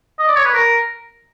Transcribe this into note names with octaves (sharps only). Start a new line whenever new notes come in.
D#5
D5
C#5
B4
A#4